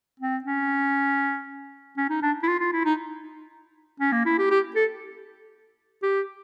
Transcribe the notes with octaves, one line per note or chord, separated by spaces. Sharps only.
C4
C#4
C#4
D#4
D4
E4
F4
F4
E4
D#4
C#4
A#3
E4
G4
G4
A4
G4